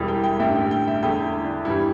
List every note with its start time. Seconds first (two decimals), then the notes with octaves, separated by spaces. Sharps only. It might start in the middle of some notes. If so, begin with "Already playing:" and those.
Already playing: E1 E2 E3 G3
0.08 G5
0.24 G5
0.40 A1 G2 D3 E5
0.55 G5
0.71 G5
0.87 E5
1.03 E2 D3 A3 G5
1.24 E4
1.45 D4
1.65 G1 G2 E3 G3 E4